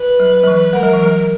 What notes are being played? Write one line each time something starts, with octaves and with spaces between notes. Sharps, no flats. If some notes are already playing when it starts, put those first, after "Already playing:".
Already playing: B4
F#3
F#3
E3
G#3 A#4
F#3
E3
F#3